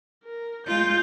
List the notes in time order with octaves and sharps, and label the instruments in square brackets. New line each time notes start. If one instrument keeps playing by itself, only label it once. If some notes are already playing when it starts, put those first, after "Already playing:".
[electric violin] A#4
[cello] G#3 F4 [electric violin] G6